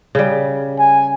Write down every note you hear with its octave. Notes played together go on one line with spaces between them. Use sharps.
C#3 G3
G#5